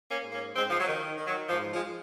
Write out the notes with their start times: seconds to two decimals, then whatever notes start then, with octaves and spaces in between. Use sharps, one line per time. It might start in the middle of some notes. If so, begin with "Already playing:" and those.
0.09 A#3 C#4
0.24 G#2
0.32 A#3 C#4
0.55 G#2 G#3 C4
0.70 F3
0.79 F#3
0.87 D#3
1.18 D#3
1.25 F#3
1.49 G#2 F3
1.73 F3 G#3